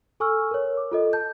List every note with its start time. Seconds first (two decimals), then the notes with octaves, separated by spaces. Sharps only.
0.20 A4 G#5 C#6 E6 F6
0.51 A#4 C#5
0.77 D6
0.92 F4 A4 D#5
1.13 A5 G6